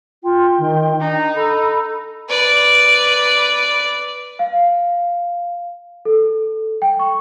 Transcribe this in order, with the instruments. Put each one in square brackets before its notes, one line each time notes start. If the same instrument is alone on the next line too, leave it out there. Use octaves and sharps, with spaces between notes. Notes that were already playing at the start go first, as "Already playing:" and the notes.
[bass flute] F4 [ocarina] G5
[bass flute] D#3
[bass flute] D4 [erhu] D#4
[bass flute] A4 [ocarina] B5
[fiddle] B4 D5
[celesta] F5
A4
G5
C#6